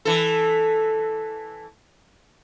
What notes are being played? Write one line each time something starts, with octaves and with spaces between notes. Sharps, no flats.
E3 A4